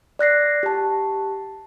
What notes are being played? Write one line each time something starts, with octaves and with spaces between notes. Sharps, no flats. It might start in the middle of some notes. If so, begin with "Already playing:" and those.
D5 F#6 A#6 C7
G4 A5